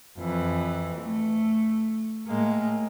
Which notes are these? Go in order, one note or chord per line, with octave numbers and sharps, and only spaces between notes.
F2 E3
A3
A2 G#3 A#3